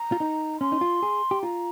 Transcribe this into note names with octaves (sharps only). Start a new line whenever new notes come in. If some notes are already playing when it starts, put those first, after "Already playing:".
Already playing: A#5
F4
D#4
C#4 C6
D#4
F4
G#4
G4
F4 A#5